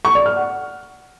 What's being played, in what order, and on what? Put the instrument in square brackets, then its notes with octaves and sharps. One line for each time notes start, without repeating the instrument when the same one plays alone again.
[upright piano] C#6
D5
F6
F#5